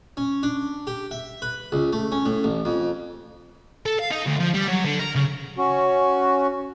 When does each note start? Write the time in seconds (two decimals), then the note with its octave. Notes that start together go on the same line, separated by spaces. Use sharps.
0.17 C#4
0.43 D4
0.87 G4
1.11 E5
1.42 B4
1.72 C#2
1.93 A3
2.12 C#4
2.26 A2
2.44 A1
2.65 F2
3.86 A4
3.99 F5
4.11 D#4
4.26 D2
4.40 F3
4.54 G3
4.67 F#3
4.85 D3
4.99 A#4
5.15 C#3
5.58 C#4 F#4